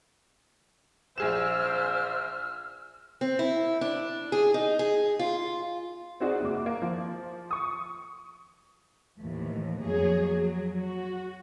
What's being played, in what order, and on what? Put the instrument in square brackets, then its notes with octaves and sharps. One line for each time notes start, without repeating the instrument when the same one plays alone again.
[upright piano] A#1 G#4 E7 [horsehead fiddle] C5 E5 [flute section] E6 F6
[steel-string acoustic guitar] C4
E4
D4
G#4
D#4
G#4
F4
[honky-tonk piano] C4 D#4 F#4 G#4 D5
F#1 G#3 D6
A#3
F3
C#6 D#6
[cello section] D#2 A2 E3 F3
F2 F#3 A#3 G#4 C#5
F#3
F#4